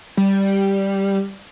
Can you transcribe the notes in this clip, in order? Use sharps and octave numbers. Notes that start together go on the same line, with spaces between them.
G3